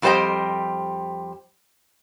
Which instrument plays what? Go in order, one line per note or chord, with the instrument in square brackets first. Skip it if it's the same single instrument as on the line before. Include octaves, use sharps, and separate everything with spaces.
[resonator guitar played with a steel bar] F2 G3 G4 C5 D#5 G5